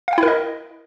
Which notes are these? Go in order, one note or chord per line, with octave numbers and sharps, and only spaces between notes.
E4 A#4 D#5 F5 G5